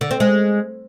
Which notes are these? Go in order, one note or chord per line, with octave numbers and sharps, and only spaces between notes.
D3
C4
G#3